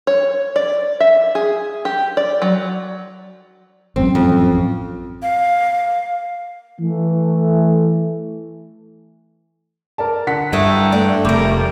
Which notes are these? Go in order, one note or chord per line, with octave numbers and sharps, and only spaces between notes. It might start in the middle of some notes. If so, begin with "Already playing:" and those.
C#5
D5
E5
G#4
G4
D5
F#3
A1 F#2 C4
F2
F5
E3 A3
A#4 D5 A5
D3 F#5 B6
G2 A3 D#4 E4
A3 D5
F1 G3 A#4 D6